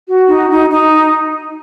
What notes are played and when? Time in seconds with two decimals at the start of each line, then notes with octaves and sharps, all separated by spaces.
0.09 F#4
0.29 D#4
0.49 D#4
0.69 D#4